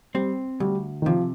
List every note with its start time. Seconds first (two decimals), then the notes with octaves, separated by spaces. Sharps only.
0.14 G3 C4
0.60 D2 G3
1.02 D#3
1.06 C3 F3